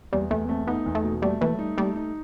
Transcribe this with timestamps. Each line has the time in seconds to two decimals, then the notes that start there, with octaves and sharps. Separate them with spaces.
0.13 E2 G3
0.30 E2 A3
0.45 B3
0.49 A3 C4
0.67 B3 D#4
0.86 E2
0.95 A3
1.04 B2
1.22 G3 A3
1.41 E3 A3
1.54 F#3
1.59 G3 D#4
1.78 G3 A3
1.96 D#4